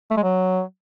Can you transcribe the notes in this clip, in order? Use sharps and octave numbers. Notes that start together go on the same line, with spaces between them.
A3
G#3
F#3